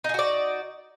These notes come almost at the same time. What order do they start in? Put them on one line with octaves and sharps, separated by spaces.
D#4 G#4 F#4 D5